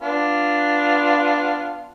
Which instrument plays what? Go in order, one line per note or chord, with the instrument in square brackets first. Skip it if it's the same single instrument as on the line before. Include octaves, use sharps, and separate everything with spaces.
[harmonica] B3 D4 F4